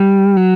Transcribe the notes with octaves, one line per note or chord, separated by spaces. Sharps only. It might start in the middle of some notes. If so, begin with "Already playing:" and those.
Already playing: G3
F#3